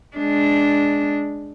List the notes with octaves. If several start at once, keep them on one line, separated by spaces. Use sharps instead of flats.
G#3 D4